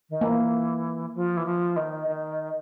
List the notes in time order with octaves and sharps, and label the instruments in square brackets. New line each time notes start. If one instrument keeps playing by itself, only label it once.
[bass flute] D#3
[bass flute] E3 [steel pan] A#3
[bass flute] F3
E3
F3
D#3
D#3